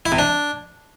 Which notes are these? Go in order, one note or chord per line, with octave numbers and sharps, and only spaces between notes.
E4
C3
D4